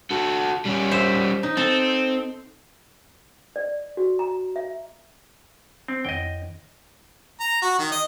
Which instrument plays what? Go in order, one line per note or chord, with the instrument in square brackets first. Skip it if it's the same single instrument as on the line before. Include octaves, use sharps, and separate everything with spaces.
[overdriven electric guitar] F#4 A4
G3 C#4
[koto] C5 E5
D#4
[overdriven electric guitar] C4 [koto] A4
[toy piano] D5
F#4
A#5
E5
[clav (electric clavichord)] C4
[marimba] F2 D#3 [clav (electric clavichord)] D#5 G5
[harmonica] A#5
F#4
D#3
D#5